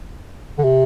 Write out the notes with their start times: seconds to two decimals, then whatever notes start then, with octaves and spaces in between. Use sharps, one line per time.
0.58 D3
0.64 C3